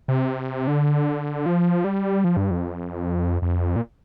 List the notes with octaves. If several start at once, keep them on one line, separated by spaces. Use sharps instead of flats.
C3
D3
F3
G3
F3
G2
F2
F2
A#2